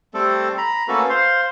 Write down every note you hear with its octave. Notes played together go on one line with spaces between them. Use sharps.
G3 A3 C4 A4
A#5 B5
A3 A#3 C#4 F#4 A4 B4
C5 F5 C6